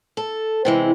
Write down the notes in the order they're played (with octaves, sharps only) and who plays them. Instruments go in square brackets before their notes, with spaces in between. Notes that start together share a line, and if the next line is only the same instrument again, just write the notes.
[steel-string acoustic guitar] A4
C3 E3 G#3